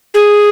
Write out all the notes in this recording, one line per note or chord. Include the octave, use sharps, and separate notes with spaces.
G#4